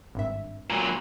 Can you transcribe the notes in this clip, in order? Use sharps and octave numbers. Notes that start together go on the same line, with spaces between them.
G#1 G2 E5
A#2 F#3